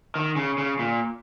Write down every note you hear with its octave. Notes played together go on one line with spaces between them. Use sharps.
D#3
C#3
C#3
A#2